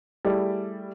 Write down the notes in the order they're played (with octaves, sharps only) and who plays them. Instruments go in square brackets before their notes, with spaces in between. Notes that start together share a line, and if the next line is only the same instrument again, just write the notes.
[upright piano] G3 A3 E4 G#4 D5